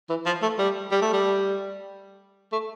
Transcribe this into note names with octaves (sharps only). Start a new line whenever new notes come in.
E3
F3
A3
G3
G3
A3
G3
A3